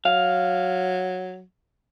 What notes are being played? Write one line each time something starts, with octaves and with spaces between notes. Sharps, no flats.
F#3 F5